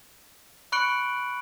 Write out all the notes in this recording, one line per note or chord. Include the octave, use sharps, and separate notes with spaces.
B5 C#6 F#6 C#7 D7 F#7